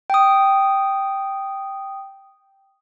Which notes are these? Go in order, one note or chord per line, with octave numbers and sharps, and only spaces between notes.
G5 D#6